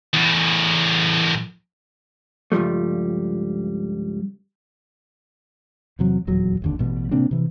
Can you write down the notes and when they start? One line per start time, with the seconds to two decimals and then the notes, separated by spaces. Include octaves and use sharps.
0.13 E2 A2
2.52 C#2 G2 F3 G3 A3
5.99 E2 C3 F#3
6.27 D#1 E2 F#3
6.62 F1 D#2 D3
6.79 A1 B2 G3
7.11 C3 A#3 C4 D4
7.31 C3 E3